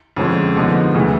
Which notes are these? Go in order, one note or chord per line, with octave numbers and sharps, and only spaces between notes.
F2 D3 F3 G#3 C#4
D3 F3 G#3 B3 D#4
D2 C#3 E3